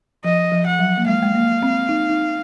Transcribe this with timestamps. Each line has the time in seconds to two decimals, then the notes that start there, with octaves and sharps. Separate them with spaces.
0.24 F3 D#5
0.52 F3
0.66 F#5
0.79 F#3
0.98 A#3
1.07 G#3 F5
1.22 G#3
1.35 A#3
1.63 C4
1.89 D#4
2.10 D#4